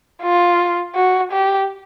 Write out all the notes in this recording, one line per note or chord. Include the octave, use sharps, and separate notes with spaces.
F4
F#4
G4